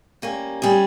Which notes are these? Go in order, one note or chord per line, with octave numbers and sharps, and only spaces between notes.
G3 A#3 C#4
G3 C#4 G#4